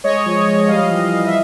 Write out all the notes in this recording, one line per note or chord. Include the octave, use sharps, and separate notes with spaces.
G#3 C#5 D#5
F3
F3
G3 D#5 F5
E3
E3
E5